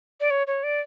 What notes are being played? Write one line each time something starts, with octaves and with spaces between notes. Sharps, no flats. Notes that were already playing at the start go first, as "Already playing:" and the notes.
D5
C#5
C#5
D5